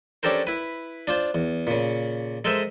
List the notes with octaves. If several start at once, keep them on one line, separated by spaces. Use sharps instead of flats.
C#4 D4 G4 A4 A#4 C5
E4 B4
D4 F4 C5
E2
A#2 C#3
G#3 A4 A#4 C5 D#5 E5